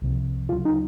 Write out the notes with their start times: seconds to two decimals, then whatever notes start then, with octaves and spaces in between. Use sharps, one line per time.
0.02 C2 C3 F3
0.49 D2 C#3 F#3 F4
0.65 D#4